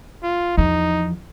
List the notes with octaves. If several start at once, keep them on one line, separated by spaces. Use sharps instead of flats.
F4
E2 F3 D#4